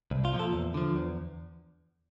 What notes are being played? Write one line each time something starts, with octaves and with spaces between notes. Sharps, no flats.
C2
F4
A#2 F3
A4
E2
D3 F3
E2